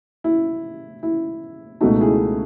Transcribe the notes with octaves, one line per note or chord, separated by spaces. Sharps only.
E4
E4
C#2 B2 A3 D#4 F#4
E4 G#4